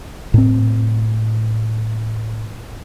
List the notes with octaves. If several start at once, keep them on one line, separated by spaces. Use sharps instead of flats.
A2 C4